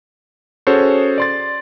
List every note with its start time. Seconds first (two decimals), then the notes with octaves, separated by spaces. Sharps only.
0.67 C#4 F#4 G#4 A4 C5 C#5
1.18 D5 C6 A6